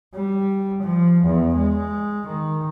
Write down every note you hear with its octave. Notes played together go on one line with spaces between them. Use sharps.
G3
F3
E2
G#3
D#3